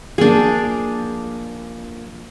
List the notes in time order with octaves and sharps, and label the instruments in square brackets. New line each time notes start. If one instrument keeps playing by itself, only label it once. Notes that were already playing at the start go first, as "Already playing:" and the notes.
[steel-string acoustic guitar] F3 A#3 [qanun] D4 G#4